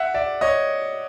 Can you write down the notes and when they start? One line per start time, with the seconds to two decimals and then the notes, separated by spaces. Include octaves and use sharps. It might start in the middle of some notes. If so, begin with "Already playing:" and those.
Already playing: E5 F#5
0.14 D5 E5
0.41 C#5 D#5